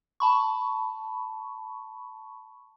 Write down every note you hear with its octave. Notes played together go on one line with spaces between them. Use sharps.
A5 B5 C#6